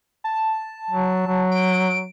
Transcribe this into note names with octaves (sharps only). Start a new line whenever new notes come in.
A5
F#3
F#3
D7